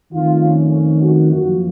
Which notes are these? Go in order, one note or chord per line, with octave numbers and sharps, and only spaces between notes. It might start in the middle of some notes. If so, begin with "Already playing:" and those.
F2 D#3 A3 F4
C#4
C#4
F#4
F#2 F3 A#3 F#4